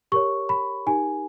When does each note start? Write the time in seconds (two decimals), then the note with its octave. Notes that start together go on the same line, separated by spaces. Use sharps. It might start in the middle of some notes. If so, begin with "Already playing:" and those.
0.12 G4 A#4 C#5 C#6
0.49 B5
0.87 D#4 G4 A#4 G#5